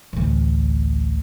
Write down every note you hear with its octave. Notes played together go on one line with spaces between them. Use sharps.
A1 D2